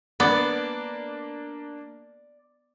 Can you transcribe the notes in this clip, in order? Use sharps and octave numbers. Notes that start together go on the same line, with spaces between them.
A#3 B3 D4 D5